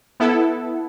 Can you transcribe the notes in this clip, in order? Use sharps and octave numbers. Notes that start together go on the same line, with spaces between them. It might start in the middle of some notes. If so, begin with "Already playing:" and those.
B3 E4 A4